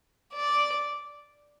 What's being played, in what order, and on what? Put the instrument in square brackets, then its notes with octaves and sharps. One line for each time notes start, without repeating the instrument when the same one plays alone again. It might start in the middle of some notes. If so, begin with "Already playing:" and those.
[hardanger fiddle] D5